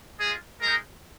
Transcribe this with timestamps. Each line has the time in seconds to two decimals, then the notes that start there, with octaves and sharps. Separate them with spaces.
0.19 G#3 F4 G#4
0.61 G#3 D#4 A#4